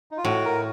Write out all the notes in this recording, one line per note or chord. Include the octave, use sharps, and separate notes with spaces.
D#4
F4
A2 F#4
A#4